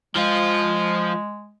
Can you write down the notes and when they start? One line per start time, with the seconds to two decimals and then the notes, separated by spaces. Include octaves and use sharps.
0.15 F3 G#3 F4